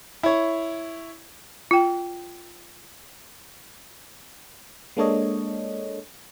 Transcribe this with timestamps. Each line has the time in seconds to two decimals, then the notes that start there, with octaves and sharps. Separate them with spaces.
0.23 E4 C#5
1.71 F4 G5
4.97 G#3 A#3 D4 A4 C#5 D#5